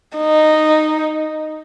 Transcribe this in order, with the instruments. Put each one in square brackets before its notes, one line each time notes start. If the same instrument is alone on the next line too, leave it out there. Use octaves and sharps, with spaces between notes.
[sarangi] D#4